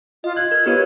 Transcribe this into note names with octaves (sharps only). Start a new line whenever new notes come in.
F4 D#5
F#6 G#6
A#4 F6
B3 F4 G4 A#4 C#5